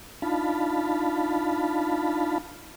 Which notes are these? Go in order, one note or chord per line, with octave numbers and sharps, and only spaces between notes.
D4 D#4 F4 F5 A5 B5